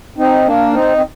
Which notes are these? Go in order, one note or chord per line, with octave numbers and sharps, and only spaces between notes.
C4 D#4
A#3 D4
C4 D#4
C4